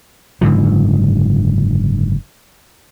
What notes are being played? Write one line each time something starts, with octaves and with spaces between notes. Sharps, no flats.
F#1 G#2 D3 F3